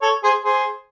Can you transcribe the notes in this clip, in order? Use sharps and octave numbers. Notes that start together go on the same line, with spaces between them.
A4 C#5
G#4 C5
G#4 C5